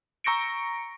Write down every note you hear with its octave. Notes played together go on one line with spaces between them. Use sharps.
A#5 C#6 A#6 C#7 D7